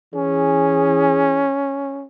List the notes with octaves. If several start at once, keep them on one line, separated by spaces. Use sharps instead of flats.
E3 C#4 G#4